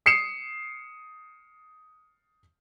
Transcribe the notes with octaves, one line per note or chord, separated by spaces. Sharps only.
D#6 C7 C#7 E7